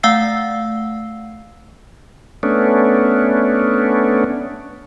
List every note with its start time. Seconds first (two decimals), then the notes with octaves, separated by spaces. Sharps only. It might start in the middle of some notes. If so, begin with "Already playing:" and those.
0.03 A3 F5 F#5 E6 A6 C7
2.43 A3 B3 C#4 D4